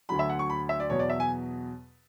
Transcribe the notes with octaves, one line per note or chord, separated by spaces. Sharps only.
D2 D3 F#3 B5
E5
F#5
C#6
B5
E5
D5
E2 B2 F#3 C#5
D5
E5
G#5